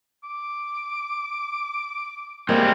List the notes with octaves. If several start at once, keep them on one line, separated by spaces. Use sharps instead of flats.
D6
G3 G#3 A#3 C4